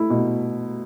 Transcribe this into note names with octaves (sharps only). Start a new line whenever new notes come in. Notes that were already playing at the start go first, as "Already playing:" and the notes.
Already playing: A3 E4
B2